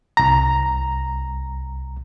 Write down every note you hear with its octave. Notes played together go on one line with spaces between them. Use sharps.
C2 A#5